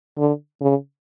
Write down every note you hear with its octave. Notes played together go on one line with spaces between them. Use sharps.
D3
C#3